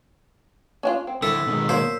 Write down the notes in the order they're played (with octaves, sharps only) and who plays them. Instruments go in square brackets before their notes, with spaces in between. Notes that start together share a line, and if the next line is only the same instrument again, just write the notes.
[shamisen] C#4 D4 F4
C4
[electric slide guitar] D3 E4 [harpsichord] A4 [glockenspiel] E6 B6
[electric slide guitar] B2 D#3 G#3
[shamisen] F#3 A#3 [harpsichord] C5